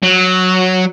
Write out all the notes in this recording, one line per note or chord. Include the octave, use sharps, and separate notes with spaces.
F#3